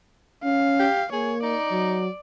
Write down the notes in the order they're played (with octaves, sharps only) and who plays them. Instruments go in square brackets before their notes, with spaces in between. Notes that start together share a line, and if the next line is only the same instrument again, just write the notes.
[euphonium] C#4 [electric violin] F5
[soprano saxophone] G4
[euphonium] A#3 [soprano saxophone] G#4 [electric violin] C#5
[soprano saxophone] D#4 [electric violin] D5
[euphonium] F#3